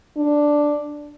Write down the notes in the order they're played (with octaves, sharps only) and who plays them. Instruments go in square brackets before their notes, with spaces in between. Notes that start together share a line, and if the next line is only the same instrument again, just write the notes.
[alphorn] D4